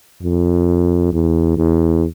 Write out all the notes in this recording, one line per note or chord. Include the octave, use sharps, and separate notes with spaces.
F2
E2
E2